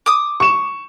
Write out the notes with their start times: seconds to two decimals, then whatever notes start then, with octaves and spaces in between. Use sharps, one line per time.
0.06 D6 D#6
0.40 C#6 E7